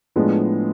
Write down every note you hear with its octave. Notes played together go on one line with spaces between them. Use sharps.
A2 F3 G#3 B3 D4